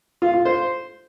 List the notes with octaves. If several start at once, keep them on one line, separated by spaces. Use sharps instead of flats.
F4
F4
C5